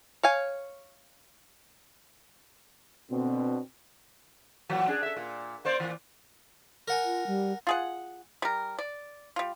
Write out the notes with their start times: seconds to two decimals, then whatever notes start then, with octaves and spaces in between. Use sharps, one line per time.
0.23 C#5 F5 G#5
3.11 B2 D3 C4
4.69 A#2 E3 F#3
4.88 D4 G#4
5.03 A4 E5
5.17 A#2
5.65 A#3 C5 D5
5.80 A#2 E3
6.88 A#4 F#5 G#5
7.04 F4
7.27 G3
7.67 F4 G#4 F#5
8.42 G3 A#4
8.79 D5
9.36 G3 F4